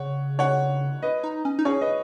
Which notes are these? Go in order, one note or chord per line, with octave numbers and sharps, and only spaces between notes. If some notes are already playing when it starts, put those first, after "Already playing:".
Already playing: C#3 C#5 F#5
C#5 F#5
B4 D#5
D#4
C#4
D#4
C#4 G#4 C#5
B4 D#5